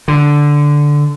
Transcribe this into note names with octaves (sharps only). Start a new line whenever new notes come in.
D3